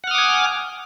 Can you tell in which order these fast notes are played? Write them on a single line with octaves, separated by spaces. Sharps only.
F#5 F6 D#6 D6 G#5